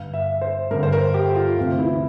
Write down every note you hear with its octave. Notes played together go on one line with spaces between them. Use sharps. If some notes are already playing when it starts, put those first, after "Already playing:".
Already playing: G2 D3 F5
E5
C5
G2 D3 A#4
C5
A#4
G4
F4
D2 C3 E3
E4